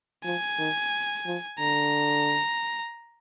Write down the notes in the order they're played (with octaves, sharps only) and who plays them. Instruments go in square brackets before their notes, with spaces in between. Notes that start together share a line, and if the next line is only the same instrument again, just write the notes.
[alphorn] F3 [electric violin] G#5
[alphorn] D#3
F3
[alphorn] D3 [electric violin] A#5